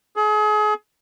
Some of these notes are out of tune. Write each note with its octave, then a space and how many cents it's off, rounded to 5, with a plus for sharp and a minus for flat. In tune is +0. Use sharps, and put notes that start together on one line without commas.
G#4 +35